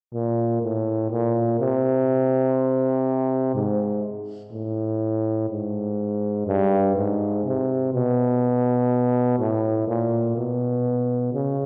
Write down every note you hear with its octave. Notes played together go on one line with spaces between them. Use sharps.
A#2
A2
A#2
C3
G#2
A2
G#2
G2
G#2
C3
B2
A2
A#2
B2
C#3